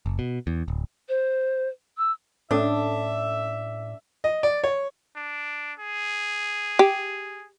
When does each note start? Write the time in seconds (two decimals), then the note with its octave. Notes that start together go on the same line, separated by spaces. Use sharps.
0.06 F#1
0.19 B2
0.47 E2
0.68 D1
1.09 C5
1.98 E6
2.51 A2 C#4 D4 A4 C#5 E5
4.24 D#5
4.43 D5
4.64 C#5
5.16 D4
5.79 G#4
6.79 G4